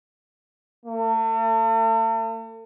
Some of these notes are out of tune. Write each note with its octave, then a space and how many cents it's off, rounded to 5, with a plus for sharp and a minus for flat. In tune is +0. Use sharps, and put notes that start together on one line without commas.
A3 +40